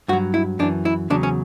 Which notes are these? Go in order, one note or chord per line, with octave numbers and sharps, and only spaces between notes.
G2 F#3 F#4
E4
F#2 E3 D4
E4
E2 C#3 F#3 D4
C#4